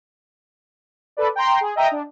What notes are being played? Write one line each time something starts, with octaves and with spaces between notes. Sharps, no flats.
A4 B4 D5
G5 A#5 C6
G#4
D#5 E5 G5 A#5 D#6
D4